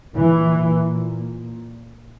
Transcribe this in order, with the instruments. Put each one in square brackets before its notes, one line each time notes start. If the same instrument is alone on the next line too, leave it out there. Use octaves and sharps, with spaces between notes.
[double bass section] A#2 E3